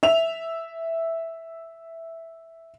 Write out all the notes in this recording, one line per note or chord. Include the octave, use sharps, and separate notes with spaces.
E5 F7